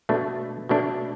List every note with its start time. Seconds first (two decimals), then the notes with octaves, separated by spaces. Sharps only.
0.09 B2 A3 D4
0.69 B2 A3 D4